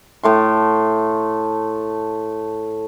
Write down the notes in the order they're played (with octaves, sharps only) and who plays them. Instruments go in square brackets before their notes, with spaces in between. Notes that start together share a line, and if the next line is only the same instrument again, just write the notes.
[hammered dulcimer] A2 A3 C6